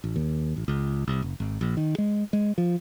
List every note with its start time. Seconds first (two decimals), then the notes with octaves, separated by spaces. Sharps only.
0.04 A1
0.16 D#2
0.56 A1
0.68 C#2
1.07 C2
1.22 F#1
1.40 G#1
1.61 A#1
1.77 D#3
1.98 G#3
2.33 G#3
2.58 F3